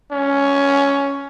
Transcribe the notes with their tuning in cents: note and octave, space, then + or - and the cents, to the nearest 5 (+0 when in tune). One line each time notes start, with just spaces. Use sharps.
C#4 +10